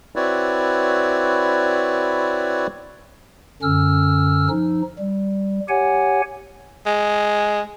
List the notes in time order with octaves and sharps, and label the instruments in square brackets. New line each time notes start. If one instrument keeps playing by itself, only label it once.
[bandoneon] C4 E4 F#4 B4 C#5 D5
[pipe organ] F#2 D3 C#4 E6 F6
F3 D#4
G3
G4 C#5 F#5 G#5
[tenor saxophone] G#3